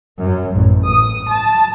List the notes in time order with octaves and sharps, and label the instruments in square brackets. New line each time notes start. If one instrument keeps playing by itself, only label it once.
[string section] F#2
A1
D#6
A5